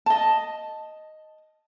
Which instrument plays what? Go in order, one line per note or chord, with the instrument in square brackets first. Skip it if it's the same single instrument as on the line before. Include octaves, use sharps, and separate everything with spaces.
[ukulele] D#5 A5